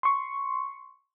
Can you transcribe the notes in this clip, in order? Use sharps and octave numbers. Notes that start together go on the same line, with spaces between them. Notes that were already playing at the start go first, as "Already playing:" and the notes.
C6 C#6